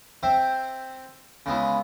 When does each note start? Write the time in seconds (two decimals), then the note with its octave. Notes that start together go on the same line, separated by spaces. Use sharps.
0.23 C4 C5 E5 G5
1.46 C#3 G#3 B3 E4